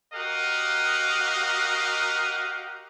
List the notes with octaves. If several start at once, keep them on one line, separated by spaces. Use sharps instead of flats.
F#4 G4 A#4 D#5 F5 F#5